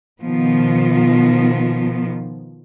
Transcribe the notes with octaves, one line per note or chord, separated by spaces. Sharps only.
B2 D#3 F3 B3